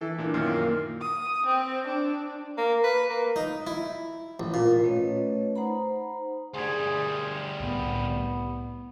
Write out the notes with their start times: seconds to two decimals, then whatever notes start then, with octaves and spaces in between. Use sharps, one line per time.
0.01 E3 A4
0.18 A#2 A#3 D4
0.34 F#2 A#2 D#3 A#3
0.53 A#3
1.01 D#6
1.46 C4
1.87 D4
2.58 A#3
2.84 B4
3.10 A#3
3.36 D#4
3.67 E4
4.40 A1
4.54 A#2
4.84 A3 C#4 B4 C#5 D#5
5.56 D#4 C5 F#5 A#5 B5
6.54 D2 G3 G#4 C6 G#6
7.60 C2 A2 B3